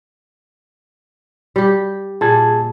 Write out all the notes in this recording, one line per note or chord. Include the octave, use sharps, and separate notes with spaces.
G3 G4
A#2 G#4 A5 G#6